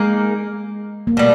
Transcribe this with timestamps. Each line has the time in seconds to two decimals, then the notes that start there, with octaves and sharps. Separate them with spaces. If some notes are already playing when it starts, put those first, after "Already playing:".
Already playing: G#3 A#3 D#4 G#4
1.07 A#3
1.17 B2 G3 A3